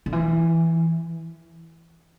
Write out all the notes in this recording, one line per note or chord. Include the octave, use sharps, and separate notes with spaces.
D3
E3